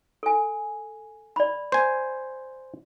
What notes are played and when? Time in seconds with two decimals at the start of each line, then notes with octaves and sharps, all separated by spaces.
0.23 A4 G#5
1.36 D5 B5
1.72 C5 G#5